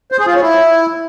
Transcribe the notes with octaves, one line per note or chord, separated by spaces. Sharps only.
C5
G#4
F4
C#4
E4